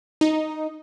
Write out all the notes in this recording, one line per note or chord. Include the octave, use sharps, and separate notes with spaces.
D#4